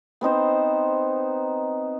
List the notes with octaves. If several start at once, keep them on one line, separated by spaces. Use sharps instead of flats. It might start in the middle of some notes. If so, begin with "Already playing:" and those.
B3 C4 D#4 C5